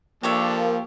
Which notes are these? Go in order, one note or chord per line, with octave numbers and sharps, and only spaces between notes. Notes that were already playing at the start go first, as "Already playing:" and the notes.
F3 A#3 D4 G4 A4 C#5 E5